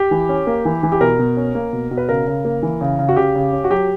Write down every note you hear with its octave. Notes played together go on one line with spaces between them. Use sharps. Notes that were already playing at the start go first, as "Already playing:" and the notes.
Already playing: G4
E3
C#4
A#3
E3
E3
G4
B2 A#4
B2
C#4
A#3
B2
B2
B4
C#3 A#4
C#3
A#3
E3
C#3
C#3
F#4
C#3 G4
C#3
C#4
F#4
F#3 G4